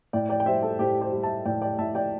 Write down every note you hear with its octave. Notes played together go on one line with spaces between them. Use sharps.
A2 D5 G5
D5 G5
G5
G3 C5 E5
A4
A2 G4 C5
G4 C5
G3
E5 A5
A2 D5 G5
D5 G5
A2 E5 A5
D5 G5